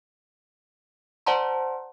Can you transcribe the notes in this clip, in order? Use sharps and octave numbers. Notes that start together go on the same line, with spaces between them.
C5 D5 F#5 A5 A#5 C6